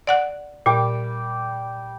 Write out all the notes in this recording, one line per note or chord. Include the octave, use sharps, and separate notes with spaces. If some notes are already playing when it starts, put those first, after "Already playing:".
D5 F#5 F#6
A#2 G3 G5 D6